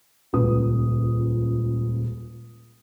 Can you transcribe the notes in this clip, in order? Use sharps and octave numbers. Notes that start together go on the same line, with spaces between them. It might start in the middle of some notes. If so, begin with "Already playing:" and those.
D#1 C#2 B4 D#6